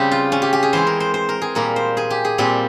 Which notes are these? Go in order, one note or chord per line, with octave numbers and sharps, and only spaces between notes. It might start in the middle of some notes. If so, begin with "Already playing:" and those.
Already playing: C#3 G3 C4 G4
F4
C#4
G4
G4
G#4
E3 G#3 C4 C5
A#4
C5
C5
A#4
G#4
A#2 G3 A#3 A#4
C5
G#4
G4
G#4
A#2 G3 C4 G4